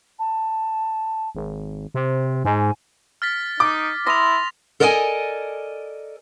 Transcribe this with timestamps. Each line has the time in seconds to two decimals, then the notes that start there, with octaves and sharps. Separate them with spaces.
0.19 A5
1.35 G#1
1.94 C3 C5
2.45 G#2 G#5
3.22 F6 A6 B6
3.60 D#4 D6
4.07 E4 C6 D#6 A#6 F7
4.80 A4 A#4 D5 D#5 F#5 G#5